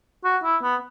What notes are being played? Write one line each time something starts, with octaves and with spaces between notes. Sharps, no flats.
F#4
E4
B3